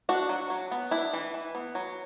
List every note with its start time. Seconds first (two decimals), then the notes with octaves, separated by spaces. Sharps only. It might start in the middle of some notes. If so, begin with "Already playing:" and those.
0.09 D4 F#4
0.29 F#3
0.50 F#3
0.71 B3
0.91 D4 E4
1.13 E3
1.34 E3
1.55 B3
1.75 F#3